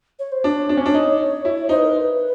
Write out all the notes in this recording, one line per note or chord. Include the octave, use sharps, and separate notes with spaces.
C#5
C5
D4 C#5
D4
C#4
D4
D#4
E4
D#4 C5
B4
A#4
B4